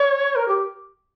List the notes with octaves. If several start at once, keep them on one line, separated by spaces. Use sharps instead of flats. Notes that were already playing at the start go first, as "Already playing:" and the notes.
Already playing: C#5
A#4
G4